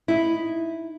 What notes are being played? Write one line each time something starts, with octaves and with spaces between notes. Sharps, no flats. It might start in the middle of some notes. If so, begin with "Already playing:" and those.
D#4 E4